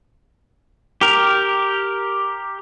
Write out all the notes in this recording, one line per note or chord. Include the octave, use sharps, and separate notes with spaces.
G4 A#4